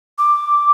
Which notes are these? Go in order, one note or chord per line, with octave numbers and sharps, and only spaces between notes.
D6